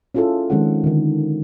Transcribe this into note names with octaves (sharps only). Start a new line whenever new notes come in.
C#4 E4 F4 G#4 A4
D#3 F3 G#3 C4 C#4 F#5
D3 D#3